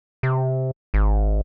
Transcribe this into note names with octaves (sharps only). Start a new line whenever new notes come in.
C3
G#1